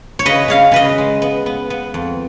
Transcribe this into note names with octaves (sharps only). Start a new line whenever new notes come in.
C#5
C#3 B4 D#5
C#3 C#5 F5
C#3 B4 D#5
G#3
B3
B3
B3
F2